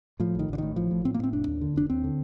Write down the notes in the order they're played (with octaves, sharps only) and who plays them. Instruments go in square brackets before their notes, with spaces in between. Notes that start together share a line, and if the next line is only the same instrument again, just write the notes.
[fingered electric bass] A2 F3
A1 D#3
A1 D3
A2 D#3
A1 F3
A2
A2 C4
A#3
A2 C4
F1 D4
D#2
D3
F1 D4
D#2 C4
D3